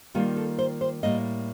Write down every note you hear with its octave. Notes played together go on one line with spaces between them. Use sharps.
D#3 G3 A#3 F4 G4
A4
C5
C5
A2 G3 A#3 D#5